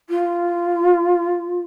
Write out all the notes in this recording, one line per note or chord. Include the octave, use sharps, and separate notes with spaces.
F4